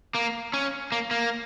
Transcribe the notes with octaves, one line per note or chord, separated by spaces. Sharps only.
A#3
C#4
A#3
A#3